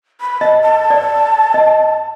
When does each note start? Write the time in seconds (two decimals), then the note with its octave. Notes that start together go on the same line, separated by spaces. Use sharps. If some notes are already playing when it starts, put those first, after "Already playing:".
0.21 B5
0.41 D#5 A5
0.61 A5
0.90 D5
1.54 D#5